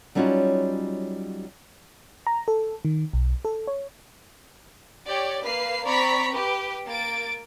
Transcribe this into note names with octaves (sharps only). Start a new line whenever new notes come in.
F#3 G3 C#4 D#4 F4 F#4
A#5
A4
D#3
B1
A4
C#5
G4 C#5 D5 G5
A#3 B4 F5 C7
C4 D5 A#5 B5 C#6 B6
G4 B4
A#3 A6 D7